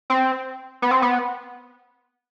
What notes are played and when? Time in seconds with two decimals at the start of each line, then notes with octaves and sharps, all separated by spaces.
0.10 C4
0.82 B3
0.91 C4
1.02 B3